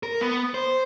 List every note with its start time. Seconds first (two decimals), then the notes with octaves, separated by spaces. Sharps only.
0.03 A#4
0.21 B3
0.54 C5